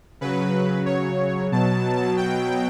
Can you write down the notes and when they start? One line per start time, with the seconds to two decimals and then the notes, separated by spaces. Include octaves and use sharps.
0.21 C#3 F#3 B4
0.86 C#5
1.52 B2 F#3 A5
2.17 G5